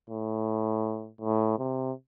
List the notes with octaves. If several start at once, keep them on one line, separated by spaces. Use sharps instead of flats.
A2
A2
C3